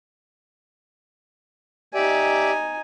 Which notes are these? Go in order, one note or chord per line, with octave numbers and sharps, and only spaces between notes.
D#4 G4 D5 E5 G#5